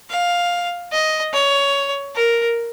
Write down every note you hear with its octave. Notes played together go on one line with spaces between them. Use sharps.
F5
D#5
C#5
A#4